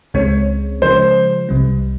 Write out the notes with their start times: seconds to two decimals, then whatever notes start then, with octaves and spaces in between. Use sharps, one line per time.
0.14 C#2 C#3 G#3 C4 C#5
0.82 C#3 F3 G#3 C5
1.49 C2 C3 G3